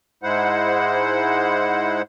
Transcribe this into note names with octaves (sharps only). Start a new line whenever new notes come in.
G#2 G#3 E4 C5 F#5